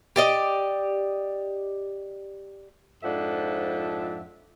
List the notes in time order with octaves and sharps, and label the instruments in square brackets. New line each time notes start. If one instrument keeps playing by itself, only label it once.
[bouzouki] G4 D5 D#5
[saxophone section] F2 G#2 F3 D4 E5 F#5